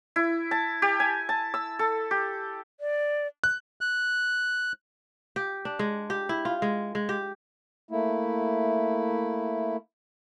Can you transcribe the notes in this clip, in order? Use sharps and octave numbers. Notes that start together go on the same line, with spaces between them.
E4
A5
G4
G#5
A5
E6
A4
G4
D5
F#6
F#6
G4
D4
G#3
G4
E4
F4
G#3
G#3
G4
A3 A#3 E4